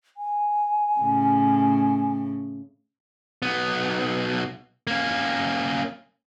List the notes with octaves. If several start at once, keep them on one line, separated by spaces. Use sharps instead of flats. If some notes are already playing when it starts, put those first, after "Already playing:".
G#5
A2 C#3
B1 B3
A#3 C#4